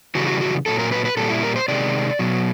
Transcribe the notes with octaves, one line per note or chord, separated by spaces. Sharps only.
C#3 E3 G3 F#4
F#4
F#4
A#2 F#3 A4
A#4
B4
B4
A#2 G3 A4
E4
A#4
C5
C3 D#3 G#3 D5
B2 F#3